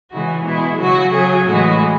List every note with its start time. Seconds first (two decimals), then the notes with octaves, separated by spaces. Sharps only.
0.11 C#3 E3 G#3 F#4
0.45 B2 G#3 E4
0.79 C#3 F#3 F#4
1.14 C#3 F#3 G#4
1.48 A2 E3 G#3 F#4